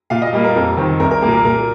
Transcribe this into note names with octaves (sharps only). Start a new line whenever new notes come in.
A#2 F5
D#5
G3 A#3
A#4
F2
D#3 C4
C2 A#4
A#4
A#2 A#3 A#4
A#4
A#2 A#4